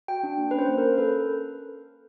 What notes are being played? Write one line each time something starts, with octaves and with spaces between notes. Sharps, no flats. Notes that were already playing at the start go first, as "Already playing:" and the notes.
F#4 G5
D4
A#3
B4
C#4 C5
A#3
A#4
C#4
A4 B4